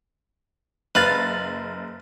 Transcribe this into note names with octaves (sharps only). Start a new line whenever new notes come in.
F#1 B4 F5 A6